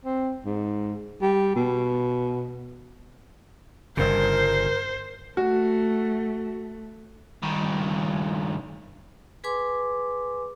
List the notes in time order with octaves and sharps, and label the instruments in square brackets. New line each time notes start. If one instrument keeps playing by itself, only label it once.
[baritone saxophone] C4
G#2
G3
B2
[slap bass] G1 G2 C#3 [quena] A#4 [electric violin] C5
[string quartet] A3 [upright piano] F#4
[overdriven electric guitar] G2 D#3
[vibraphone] G#4 B4 G#5 C6 D6